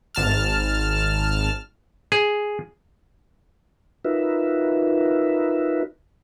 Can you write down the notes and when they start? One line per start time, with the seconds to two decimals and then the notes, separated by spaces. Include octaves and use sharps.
0.15 G#1 A5 F6
2.12 G#4
4.05 D#4 F4 F#4 A#4 B4 E5